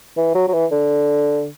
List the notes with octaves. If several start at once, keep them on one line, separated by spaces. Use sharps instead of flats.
E3
F#3
F#3
E3
D3